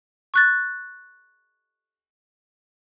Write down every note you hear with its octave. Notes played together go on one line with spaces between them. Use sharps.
C#6 F#6 A6